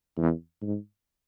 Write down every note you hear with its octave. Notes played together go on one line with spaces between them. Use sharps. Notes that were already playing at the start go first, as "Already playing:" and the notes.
E2
G#2